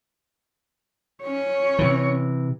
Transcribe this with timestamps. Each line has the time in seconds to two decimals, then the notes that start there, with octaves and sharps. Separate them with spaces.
1.23 C#4 C#5
1.79 C3 E3